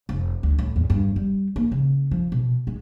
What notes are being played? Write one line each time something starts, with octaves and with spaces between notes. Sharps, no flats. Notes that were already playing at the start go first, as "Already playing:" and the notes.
F1
D2
A2
E2
G2
G3
A#3
C#3
F3
B2
G#3